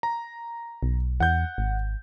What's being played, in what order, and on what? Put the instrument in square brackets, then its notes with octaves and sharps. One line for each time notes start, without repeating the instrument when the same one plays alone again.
[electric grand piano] A#5
[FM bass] B1
[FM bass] E2 [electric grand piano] F#5 G6
[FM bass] G#1